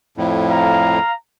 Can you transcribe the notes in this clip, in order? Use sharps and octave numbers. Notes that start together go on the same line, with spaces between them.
F2 A2
F5 A#5